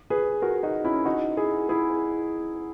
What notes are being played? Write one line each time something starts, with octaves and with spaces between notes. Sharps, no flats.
G#4 B4
F#4 A#4
D#4 F#4
C#4 E4
D#4 F#4
E4 G#4
E4 G#4